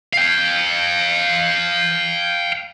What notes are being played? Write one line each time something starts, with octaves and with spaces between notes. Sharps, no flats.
F5 G5